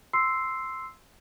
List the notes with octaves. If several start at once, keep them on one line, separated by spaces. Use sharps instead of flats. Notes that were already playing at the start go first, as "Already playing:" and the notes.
C6 E6 C7